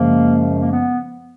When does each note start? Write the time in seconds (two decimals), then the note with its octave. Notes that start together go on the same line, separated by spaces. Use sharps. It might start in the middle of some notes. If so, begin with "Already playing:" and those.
Already playing: F#2 C#3 F3 G#3 A#3
0.59 A#3
0.71 B3